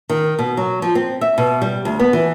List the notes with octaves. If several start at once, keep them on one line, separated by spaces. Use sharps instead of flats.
D#3
B2
F#3
F3
C4
E5
B2
G3
D2
B3
E3